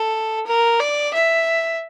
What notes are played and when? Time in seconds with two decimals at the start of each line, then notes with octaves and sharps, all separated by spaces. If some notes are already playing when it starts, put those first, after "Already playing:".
Already playing: A4
0.47 A#4
0.80 D5
1.14 E5